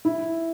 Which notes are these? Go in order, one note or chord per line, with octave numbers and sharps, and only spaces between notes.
E4